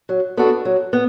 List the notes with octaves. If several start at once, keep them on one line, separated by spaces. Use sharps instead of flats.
F#3
B3 D4 F#4 A4
F#3
B3